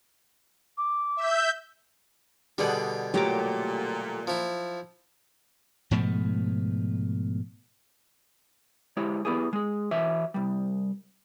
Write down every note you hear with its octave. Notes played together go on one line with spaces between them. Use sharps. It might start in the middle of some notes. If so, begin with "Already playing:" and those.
D6
E5 G6
B2 D3 G3 G#4 D5 F#5
A#2 F#3 A3 G4 A#5 D6
F3 E4
G#2 B2 F3 A3
G#3 E4 G4 C#5
B3 E4 G4 G#4
G#3 G#4
E3 F#4 C#5 E5
C2 G3